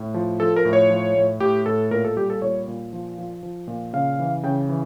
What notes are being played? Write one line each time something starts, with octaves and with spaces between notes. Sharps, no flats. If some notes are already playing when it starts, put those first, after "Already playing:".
Already playing: A2
F3
F3 A4
A#4
A2
C#5
F3
A2
A2 G4
A2 A4
A#2 A#4
A4
G3 G4
A4
A#2 C#5
A#2
F3
F3
F3
A#2
C#3 F5
E3
C#3 G5
E3